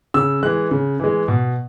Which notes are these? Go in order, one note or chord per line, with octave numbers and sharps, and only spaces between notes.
C#3 E6
E3 G#3 F#6
C#3
E3 G#3
B2